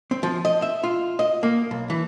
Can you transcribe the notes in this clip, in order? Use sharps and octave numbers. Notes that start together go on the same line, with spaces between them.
C4
F3
D#5
E5
F4
D#5
A#3
B1
E3